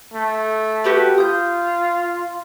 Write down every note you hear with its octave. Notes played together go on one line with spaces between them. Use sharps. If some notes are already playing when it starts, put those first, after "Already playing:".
A3
F#4 G4 B4
F4 D#6 G6